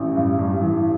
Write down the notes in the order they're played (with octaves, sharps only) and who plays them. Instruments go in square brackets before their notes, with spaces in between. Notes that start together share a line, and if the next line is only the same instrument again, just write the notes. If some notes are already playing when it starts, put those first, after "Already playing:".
Already playing: [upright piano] A1 E3
G2
G2
E3